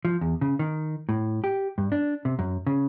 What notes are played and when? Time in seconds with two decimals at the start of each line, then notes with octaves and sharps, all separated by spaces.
0.05 F3
0.21 E2
0.41 C#3
0.59 D#3
1.09 A2
1.44 G4
1.78 G2
1.92 D4
2.25 C3
2.39 F#2
2.67 C#3